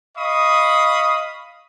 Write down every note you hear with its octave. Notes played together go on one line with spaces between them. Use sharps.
D#5 F5 B5 C#6 D#6